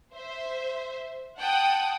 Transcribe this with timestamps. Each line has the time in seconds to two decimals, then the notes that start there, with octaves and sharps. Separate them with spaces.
0.13 C5 E5
1.39 F#5 G5 A5 D#6